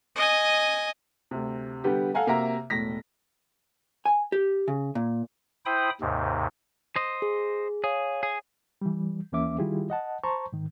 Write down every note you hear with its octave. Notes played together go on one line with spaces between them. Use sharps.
D#5 G#5
D2 C3
D3 G3 B3 G4
A4 F5 F#5 G#5 A#5
C3 A#3 F#4 E5 A#5
E1 A2 A#6 B6
G#5
G4
C#3
A#2
E4 C5 G5 B5 D#6
D#2 G#2 C3
C5 D#5
G#4
G#4 C#5 F5
G#4
E3 G3
D#2 E3 A#3 C#4 E5 D6
D#3 G3 E4 F4 G4 G#4
D#5 F#5 A5
C5 A5 A#5 C6 C#6
G#2 D#3